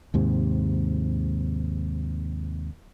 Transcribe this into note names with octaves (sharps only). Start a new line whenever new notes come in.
D#2 G#2 C3